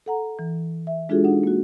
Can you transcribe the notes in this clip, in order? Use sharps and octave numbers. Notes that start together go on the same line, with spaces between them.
A4 F#5 A#5
E3
E5
G#3 D4 F4 F#4 G#4 A4
D4 D#4 F#5
A#3 F#4